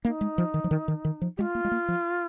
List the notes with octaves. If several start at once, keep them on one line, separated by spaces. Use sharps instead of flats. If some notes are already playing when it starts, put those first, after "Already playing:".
A#3 D#4
G#3
F3
D#3
F3
D#3
D#3
D#3
F3
G#3 F4 G4
A#3
G#3
A#3
F3